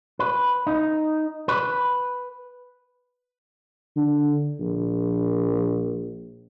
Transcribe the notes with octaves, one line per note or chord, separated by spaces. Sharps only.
B4
D#4
B4
D3
A#1